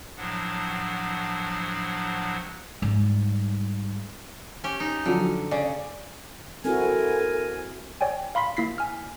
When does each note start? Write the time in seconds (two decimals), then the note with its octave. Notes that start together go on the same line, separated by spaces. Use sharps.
0.17 A2 F3 F#3 D4 F#5
2.82 G#2 G3
4.64 C#4 G4
4.80 D#4
5.05 D3 F3 F#3
5.51 C#3 D5
6.65 C4 E4 F#4 A4 A#4 G#5
8.01 C#5 D5 G5 G#5
8.35 F5 B5 C6 B6
8.57 A#3 E4 B6 C7
8.78 G#5 F6